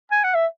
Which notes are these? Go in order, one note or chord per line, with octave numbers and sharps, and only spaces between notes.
G#5
F#5
E5